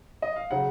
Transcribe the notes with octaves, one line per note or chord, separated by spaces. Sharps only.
D#5
F5
C#3 F#3 F#5